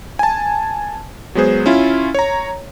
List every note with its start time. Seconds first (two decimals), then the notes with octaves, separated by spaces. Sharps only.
0.19 G#5 A5
1.35 F#3 G#3 B3 G#4 C5
1.66 C#4 E4 F4
2.15 C#5 A#5